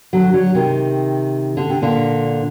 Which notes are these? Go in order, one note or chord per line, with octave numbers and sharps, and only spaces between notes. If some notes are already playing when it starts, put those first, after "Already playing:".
D3 F#3
D3 F#3
C3 D#3
D3
C3
A#2 D3